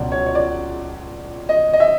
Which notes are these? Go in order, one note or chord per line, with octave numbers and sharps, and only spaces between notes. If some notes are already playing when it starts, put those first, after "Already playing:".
Already playing: C#2 B2 F#3 D5
C#5
C#5
D5
D#5
D#5
E5